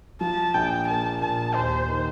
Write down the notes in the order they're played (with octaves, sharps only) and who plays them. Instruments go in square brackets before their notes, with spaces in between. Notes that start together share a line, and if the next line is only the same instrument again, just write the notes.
[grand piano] F3 [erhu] A5
[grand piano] A#1 [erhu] G5
[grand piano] A#3 [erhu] A5
[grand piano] A#2 [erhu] A5
[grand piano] D#2 [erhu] C5
[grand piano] D#3